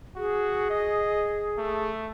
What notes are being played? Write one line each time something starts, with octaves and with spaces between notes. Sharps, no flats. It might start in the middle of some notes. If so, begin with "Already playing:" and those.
F#4 G#4
D#5
A3